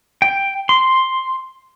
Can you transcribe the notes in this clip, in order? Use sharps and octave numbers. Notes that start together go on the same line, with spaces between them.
G5
C6